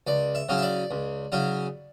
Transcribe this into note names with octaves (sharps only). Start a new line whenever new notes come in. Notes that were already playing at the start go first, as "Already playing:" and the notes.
C#2 D5
E5
C#3 F#3 C#4 E4
E5
D5
C#2
C#3 F#3 C#4 E4